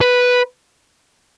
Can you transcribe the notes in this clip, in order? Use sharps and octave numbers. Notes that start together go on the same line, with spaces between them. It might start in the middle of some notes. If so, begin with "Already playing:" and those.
B4